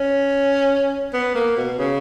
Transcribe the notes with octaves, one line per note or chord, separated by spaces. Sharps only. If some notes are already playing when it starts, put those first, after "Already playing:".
Already playing: C#4
B3
A#3
B2
C#3